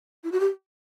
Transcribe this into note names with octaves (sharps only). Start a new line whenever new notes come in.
E4
F#4
G4